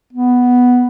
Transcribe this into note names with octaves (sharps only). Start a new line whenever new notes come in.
B3